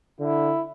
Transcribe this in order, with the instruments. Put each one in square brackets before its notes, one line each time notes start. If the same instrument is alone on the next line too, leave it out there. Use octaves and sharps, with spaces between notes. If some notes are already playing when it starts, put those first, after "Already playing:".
[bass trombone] D3 [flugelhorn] E4